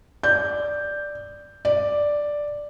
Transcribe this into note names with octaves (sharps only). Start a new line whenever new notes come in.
D5 G6
D5